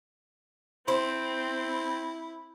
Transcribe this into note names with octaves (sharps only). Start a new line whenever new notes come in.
C4 E4 C5